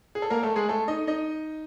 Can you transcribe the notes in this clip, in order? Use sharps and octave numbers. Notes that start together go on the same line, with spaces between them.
G#4
A4
A#3 A#4
A3 A4
G#3 G#4
A3 A4
D#4 D#5
D#4 D#5